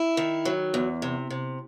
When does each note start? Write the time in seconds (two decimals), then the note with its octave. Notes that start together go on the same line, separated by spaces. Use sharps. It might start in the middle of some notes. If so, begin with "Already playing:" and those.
Already playing: E4
0.17 D#3
0.45 F#3
0.74 E2
1.02 C3
1.30 C3